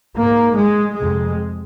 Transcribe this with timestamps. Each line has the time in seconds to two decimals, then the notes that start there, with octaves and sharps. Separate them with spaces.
0.17 G#2 A#3
0.57 G#3
0.97 F2 C3 G#3